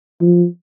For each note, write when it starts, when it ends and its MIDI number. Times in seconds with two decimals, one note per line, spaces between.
0.21 0.45 53